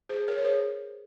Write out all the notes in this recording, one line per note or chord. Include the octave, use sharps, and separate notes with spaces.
G#4 C5
A#4 C#5
C#5
G#4 C5